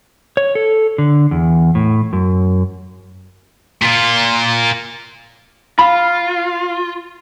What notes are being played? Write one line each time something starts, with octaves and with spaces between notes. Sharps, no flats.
C#5
A4
D3
E2
A2
F#2
A#2 F4
F4 B5